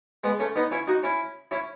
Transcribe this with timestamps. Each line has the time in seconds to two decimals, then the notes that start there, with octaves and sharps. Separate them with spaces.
0.24 G#3 B3
0.39 A3 C#4
0.56 B3 D#4
0.71 C#4 E4
0.87 D#4 F#4
1.03 C#4 E4
1.51 C#4 E4